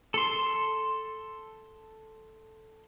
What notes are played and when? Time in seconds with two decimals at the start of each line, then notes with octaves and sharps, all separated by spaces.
0.14 A4 C6